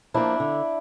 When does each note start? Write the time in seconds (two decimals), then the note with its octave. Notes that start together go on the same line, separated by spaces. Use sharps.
0.14 F3 A#3 D4 E4
0.40 D3